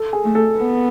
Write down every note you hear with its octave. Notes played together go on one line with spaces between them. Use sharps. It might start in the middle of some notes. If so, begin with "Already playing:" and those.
Already playing: A4
G#4
A3
A4
B3